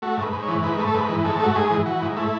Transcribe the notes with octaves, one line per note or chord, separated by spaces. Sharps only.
A3 F#4
G#2 B4
G#2
C#5
E3
G#2 B4
A3
A4
G#2 B4
E3
G#2 A4
A3 F#4
G#2 G#4
E3
E3 F#4
G#2
A3 E4